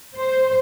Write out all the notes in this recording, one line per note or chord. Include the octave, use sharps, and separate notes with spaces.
C5